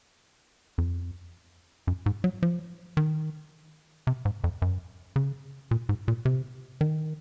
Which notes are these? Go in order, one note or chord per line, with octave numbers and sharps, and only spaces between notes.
F2
F#2
G#2
F#3
F3
D#3
C3
G#2
F2
F#2
C#3
A#2
G#2
A#2
C3
D#3